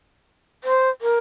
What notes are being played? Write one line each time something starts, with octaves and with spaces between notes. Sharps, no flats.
C5
A#4